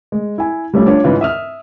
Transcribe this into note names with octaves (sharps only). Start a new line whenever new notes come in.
G#3
E4 G#5
G3 A3 C#4 F4 G4
D4 F4 C#5
G#2 C#3 E3 F4
E5 D#6 F6